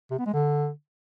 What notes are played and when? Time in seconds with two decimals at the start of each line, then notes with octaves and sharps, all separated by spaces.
0.11 C3
0.19 B3
0.26 G#3
0.34 D3